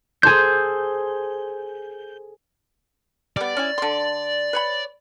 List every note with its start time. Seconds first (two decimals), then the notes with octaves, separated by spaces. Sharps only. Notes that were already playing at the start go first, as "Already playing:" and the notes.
0.23 G#4 A4 C5 G6
3.37 G3 B3 D5
3.57 C#4 E4 G#5
3.78 D3 C6
4.53 B4 C#5 B5